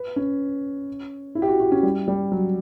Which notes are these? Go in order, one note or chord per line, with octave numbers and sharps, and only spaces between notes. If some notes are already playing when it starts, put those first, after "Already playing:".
Already playing: B4
C#4
E4
G4
F#4
F#4
C#4
G3
G3
F#3